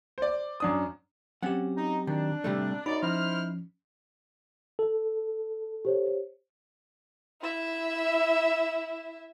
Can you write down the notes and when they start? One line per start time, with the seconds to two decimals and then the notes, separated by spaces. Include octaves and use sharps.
0.18 C5 D5
0.60 F#2 D4 D#6
1.43 F#3 C4 C#4 G4 F#5
1.77 D#4
2.07 D#3 D4
2.44 C3 G3 A3
2.86 F#2 D#4 D5 B5
3.03 F3 C#4 E4 C5 F6
4.79 A4
5.85 G4 C5 C#5
7.42 E4 E5